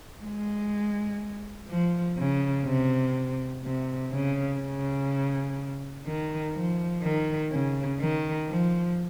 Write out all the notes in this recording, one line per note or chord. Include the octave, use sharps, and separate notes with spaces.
G#3
F3
C#3
C3
C3
C#3
C#3
D#3
F3
D#3
C#3
D#3
F3